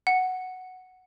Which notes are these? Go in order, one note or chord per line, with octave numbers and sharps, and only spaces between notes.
F#5